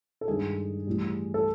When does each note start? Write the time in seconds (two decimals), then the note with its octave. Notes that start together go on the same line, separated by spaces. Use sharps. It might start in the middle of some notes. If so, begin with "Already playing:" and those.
0.21 A4
0.27 G2 D#3 G#3 G#4
0.87 A2 E3 G3
1.34 A4